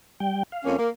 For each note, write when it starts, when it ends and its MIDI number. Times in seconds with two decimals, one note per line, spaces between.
0.20 0.43 55
0.20 0.43 79
0.52 0.79 77
0.65 0.77 41
0.65 0.77 58
0.65 0.77 61
0.78 0.89 58